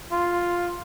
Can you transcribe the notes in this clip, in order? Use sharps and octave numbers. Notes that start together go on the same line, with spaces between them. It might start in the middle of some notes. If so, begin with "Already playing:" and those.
F4